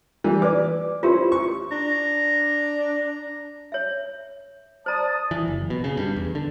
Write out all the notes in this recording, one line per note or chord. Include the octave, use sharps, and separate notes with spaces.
E3 G3
B4 D5 D6
C#4 E4 F4 G4 A#4 C5
C#6
D4 A#5
C#5 E5
C5 D5 A5 A#5 D#6
E3
F#1
B2
C#3
G2
E2
D3